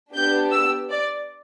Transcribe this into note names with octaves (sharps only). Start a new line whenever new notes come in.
B3 D4 G4 G6
E6
D5